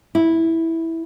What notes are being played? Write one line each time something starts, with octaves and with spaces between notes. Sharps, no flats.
E4